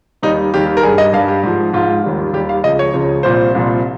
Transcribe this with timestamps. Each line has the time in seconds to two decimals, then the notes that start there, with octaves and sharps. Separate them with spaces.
0.22 D#2 D#3 G3 D#4
0.54 D#2 D#3 G3 G4
0.77 A#4
0.83 G3 G#4
0.87 G2
0.98 D#5
1.13 G2 F5
1.17 G3
1.28 G4
1.43 G#2 F3
1.73 G#2 F3 F4
2.04 D#2 D#3 G3
2.33 D#2 D#3 G3 G4
2.49 F5
2.64 C#2 C#3 F3 D#5
2.79 C#5
2.94 C#2 C#3 F3
3.23 C2 A#2 F3 C5
3.54 C2 A#2 F3